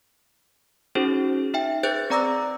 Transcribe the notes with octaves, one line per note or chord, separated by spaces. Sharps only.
C#4 D#4 F#4 G#4 C5
D#4 E5 G5
G#4 B4 C5 F#6 G6 A6
C4 D5 A#5 D6 E6 A#6